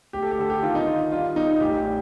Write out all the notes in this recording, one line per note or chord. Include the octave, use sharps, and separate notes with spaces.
D2 G4
A4
G4
D3 A4
G4
D#3 F4
D#4
D#3 F4
G3 F4
G3 D#4
A1 G4
G3